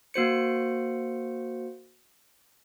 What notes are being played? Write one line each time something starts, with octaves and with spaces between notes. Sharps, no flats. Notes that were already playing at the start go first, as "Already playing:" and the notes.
A#3 F#4 C5 C#7